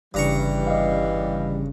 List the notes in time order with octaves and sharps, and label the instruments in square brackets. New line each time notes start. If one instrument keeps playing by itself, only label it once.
[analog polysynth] G1 C#3 [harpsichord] G2 A#5 C#6 [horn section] E3 G3
[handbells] D#5 F5